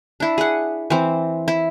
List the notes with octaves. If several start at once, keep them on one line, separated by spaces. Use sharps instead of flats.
D4 E4
G#4 F#5
E3 C4
E4